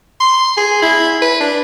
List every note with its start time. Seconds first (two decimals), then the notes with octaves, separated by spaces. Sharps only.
0.20 C6
0.57 G#4
0.82 E4
1.22 B4
1.41 D4